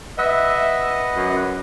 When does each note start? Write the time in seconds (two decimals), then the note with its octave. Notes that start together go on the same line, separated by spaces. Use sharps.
0.18 B4 D#5 E5 F#5
1.16 F#2